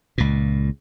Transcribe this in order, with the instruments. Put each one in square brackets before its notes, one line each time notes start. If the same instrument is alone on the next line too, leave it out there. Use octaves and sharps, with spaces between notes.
[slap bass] C#2 A#2